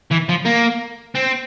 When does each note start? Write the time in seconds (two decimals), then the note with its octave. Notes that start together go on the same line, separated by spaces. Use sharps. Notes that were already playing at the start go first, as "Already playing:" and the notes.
0.11 E3
0.29 F3
0.46 A#3
1.15 C4